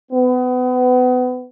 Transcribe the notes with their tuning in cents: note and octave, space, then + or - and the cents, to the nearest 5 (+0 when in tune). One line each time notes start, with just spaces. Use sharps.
B3 +30